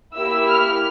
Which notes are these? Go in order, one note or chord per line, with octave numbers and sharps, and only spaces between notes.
A#3 E4 G4 E6
F6